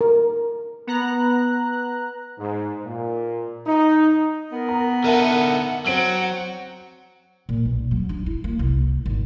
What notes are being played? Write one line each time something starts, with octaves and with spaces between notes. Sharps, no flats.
A#4
B3 A#5 F#6
G#2
A#2
D#4
B3 A#4
A#5
D3 D#4 A#4 E5 F#5 A5
F#3 C4 F#5 D7 F#7
A#2
B1
F#3
D4
E4
A#3
C2
G#1